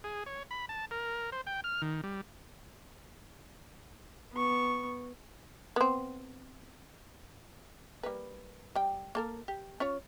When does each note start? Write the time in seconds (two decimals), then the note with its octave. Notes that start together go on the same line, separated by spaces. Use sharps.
0.04 G#4
0.26 C#5
0.51 B5
0.69 A5
0.91 A#4
1.32 C5
1.47 G5
1.64 F6
1.82 D#3
2.04 G3
4.33 B3 C#6
5.76 B3 C4
8.03 G3 A#3 B4
8.75 G3 G5
9.15 A#3 A4 A#4
9.48 G4
9.80 C#4 F4 C#5